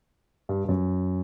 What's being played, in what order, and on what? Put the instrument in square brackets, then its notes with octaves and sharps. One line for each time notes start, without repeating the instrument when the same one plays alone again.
[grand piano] G2
G2
F#2